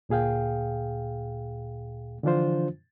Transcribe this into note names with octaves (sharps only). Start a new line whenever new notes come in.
D2 A#2 G#4 F5 G5
D3 E3 F3 D4 F4 C5